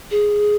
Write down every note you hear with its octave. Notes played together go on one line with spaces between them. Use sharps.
G#4